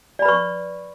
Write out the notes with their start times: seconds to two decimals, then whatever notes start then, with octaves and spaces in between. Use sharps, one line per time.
0.19 D5
0.22 B5
0.25 B4
0.29 C#6